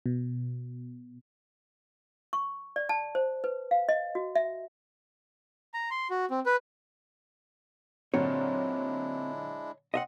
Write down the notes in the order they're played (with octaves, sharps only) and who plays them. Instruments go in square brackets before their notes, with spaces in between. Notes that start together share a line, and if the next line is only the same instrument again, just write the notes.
[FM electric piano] B2
[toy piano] C#6
D5
A5
C5
B4
F5
D#5
F#4
E5
[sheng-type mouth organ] A#5
C6
F#4
C4
B4
[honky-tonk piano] A#2 D3 F#3 [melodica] G#3 D4 E4 [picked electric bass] C4 [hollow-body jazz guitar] C#5
[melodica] C4 C6 [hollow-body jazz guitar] D#5 E5 F#5